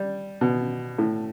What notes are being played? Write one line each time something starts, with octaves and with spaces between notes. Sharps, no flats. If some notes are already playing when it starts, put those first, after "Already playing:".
Already playing: G3
B2
A2